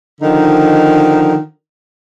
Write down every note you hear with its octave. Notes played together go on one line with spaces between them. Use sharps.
D3 D#3 F3 D#4